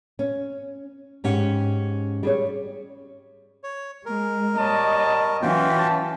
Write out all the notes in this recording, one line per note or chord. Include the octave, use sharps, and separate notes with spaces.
C#4
G#2 C#4 G4 F#5
G3 G#4 C#5
C#5
G#3 A#4
G3 C#5 D#5 A5
E3 F#3 C#4 F4 F#4 G5
A5